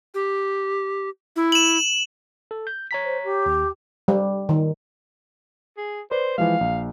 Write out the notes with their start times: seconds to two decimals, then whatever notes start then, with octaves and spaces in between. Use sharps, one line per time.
0.14 G4
1.36 E4
1.52 E7 F#7
2.51 A4
2.67 G6
2.91 C#5 A#5 B6
3.04 C5
3.23 G4
3.46 D#2
4.08 G3
4.49 D#3
5.77 G#4
6.11 B4 C5 D5 C6
6.38 E3 F3 G#3 F5
6.61 A#1